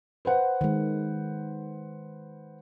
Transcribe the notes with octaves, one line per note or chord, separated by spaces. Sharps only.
B4 C5 F#5
D#3 G#3